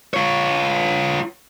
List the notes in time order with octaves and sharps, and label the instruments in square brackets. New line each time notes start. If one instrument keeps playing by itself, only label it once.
[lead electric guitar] F4 C#5